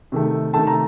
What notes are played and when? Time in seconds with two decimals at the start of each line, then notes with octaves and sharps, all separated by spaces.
0.12 C3 D#3 A3
0.54 C3 D#3 A3 A5
0.67 A#5